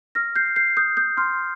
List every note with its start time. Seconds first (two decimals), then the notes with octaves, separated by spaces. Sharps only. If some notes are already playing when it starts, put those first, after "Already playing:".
0.15 F6 A#6
0.35 G6 C7
0.56 G6 C7
0.77 D#6 G6
0.97 D#6 G6
1.17 C6 F6